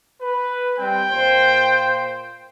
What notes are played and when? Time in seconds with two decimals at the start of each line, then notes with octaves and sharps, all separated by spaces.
0.22 B4
0.79 G3 C4 G5
1.12 A#2 A#3 C5